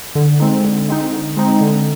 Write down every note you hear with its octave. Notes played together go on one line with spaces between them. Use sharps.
D3
G#3 C4 D#4
D3
G#3 C4 D#4
D3
G#3 C4 D#4
D3